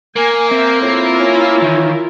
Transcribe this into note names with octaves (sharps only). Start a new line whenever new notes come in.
A#3 A#4 G#5
C4 E5
A2 E4 F4 A#4
C#4
D#3 E3